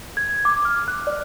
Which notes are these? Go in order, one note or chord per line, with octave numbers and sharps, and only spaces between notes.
G#6
D6
F6
F#6
D5